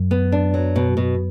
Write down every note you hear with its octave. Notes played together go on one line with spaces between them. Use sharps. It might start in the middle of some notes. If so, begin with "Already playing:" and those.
Already playing: F#2
B3
D4
F#3
B2
B2